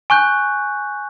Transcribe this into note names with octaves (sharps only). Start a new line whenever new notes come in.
G#5 C#6 F#6 G6